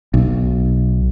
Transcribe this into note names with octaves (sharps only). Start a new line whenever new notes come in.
B1